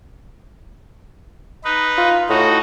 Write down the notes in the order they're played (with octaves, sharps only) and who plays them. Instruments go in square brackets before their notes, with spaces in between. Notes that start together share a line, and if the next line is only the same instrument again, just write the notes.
[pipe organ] D#4 B4
[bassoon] F4
[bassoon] A2 [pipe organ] D#4 F#4